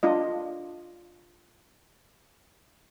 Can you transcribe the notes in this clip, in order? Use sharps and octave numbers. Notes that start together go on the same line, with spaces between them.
D4 F4 D#5